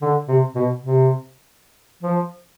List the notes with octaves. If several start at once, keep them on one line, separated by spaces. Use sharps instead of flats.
D3
C3
B2
C3
F3